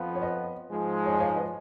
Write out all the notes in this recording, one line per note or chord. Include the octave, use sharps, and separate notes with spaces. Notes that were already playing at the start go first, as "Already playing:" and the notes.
Already playing: F2 F3 B3 F4
C#5
B4 D#5
G#2 F3 G#3
C#5
D#5
C#5 F5
B4 D#5